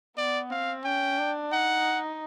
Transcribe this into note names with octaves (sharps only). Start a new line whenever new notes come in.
B3 D5
C4 F5
C#4 G5
D4
D#4 F#5